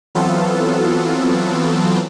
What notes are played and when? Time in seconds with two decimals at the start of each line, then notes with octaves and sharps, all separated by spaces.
0.15 E3 F#3 B3 C4 F4 A4